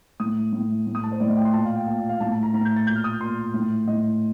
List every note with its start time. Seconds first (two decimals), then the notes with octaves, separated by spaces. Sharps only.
0.20 A2 D#6
0.53 A2
0.87 A2
0.95 D#6
1.04 A5
1.12 C5
1.20 A2 D5
1.28 D#5
1.37 G5
1.45 C6
1.53 A#2 A5
1.65 F5
1.76 G5
1.87 A#2 F5
2.09 F5
2.20 A2 A5
2.32 A5
2.43 A#5
2.53 A2 A#5
2.65 G6
2.76 A6
2.87 A#2 G6
2.96 F6
3.04 D#6
3.21 A#2 C6
3.54 A2
3.87 A2 D#5